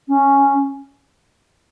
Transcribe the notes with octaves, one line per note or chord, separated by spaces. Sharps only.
C#4